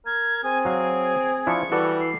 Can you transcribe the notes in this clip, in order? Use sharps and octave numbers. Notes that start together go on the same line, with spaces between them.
A#4 G#6
C4 G#4 G#5
F#3 F5 G#5
F3 D4 E4 C#6
E3 G3 F#4 A4 D5
C7